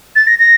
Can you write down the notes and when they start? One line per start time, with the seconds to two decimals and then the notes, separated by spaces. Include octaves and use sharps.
0.16 A6
0.27 A#6
0.39 A#6